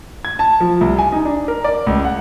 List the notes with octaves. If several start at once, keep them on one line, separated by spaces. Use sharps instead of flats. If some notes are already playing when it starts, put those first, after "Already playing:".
G#6
A5
F3
C2
G#5
D#4
D4
A#4
D5
C#2
F#5